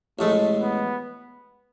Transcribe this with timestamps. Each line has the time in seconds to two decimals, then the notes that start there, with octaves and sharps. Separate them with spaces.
0.19 A1 A2 G#3 A3
0.61 B3